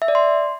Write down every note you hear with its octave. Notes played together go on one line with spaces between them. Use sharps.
E5
D5
C6